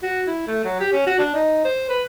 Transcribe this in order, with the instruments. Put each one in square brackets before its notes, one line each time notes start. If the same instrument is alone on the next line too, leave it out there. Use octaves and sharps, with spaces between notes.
[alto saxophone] F#4
E4
A3
F#3
G4
C#4
F#4
D4
D#4
C5
B4